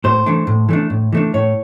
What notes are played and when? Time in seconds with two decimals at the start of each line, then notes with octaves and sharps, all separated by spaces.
0.04 A2 C5
0.26 E3 A3 D4
0.47 A2
0.69 E3 A3 D4
0.90 A2
1.12 E3 A3 D4
1.34 A2 C#5